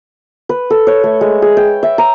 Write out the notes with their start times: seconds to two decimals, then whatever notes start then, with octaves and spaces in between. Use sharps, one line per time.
0.49 B4
0.70 A4
0.87 C#5
1.04 A3
1.21 G#3
1.42 G#4
1.57 G5
1.83 E5
1.98 A#5